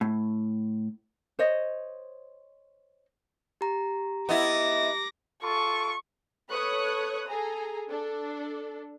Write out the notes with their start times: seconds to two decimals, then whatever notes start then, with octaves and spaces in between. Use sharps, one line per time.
0.01 A2
1.39 C5 C#5 D#5
3.61 G4 A#5
4.29 B3 E4 D#5 D6 A#6
5.43 F4 A4 C#6
6.50 A4 B4 C#5 C#6 D#6 F#6
7.28 G#4 A4 G#5 A#5
7.90 D4 A4